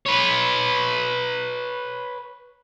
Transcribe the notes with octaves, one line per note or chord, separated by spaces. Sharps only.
B4 C#5